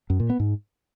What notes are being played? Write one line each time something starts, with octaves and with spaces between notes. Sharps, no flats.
F#2
A#2
B3
G#2